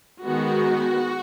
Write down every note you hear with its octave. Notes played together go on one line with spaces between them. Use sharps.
D#3 G#3 B3 F#4